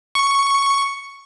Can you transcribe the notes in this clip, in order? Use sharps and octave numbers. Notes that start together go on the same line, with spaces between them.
C#6